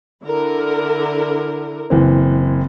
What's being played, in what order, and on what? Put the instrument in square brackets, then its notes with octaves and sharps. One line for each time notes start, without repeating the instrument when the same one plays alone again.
[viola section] D3 E4 A#4
[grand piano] F#1 E3 C4